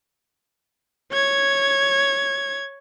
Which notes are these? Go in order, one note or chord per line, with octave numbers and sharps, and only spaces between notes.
C#5 G#6